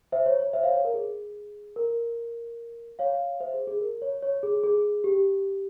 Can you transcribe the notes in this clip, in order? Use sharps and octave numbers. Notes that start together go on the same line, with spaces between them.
C5 E5
C#5
C#5
C5 E5
C#5 F5
C#5
A#4
G#4
A#4
C#5 F5
C5 E5
G#4
G#4
A#4
C#5
C#5
G#4
G#4
G4